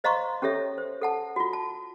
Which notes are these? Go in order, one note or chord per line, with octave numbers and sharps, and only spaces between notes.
C5 D#5 F5 A#5 C6 C#6
C#4 G4 A4 C#5 E5
C5
A4 F#5 A5
F4 F#4
A5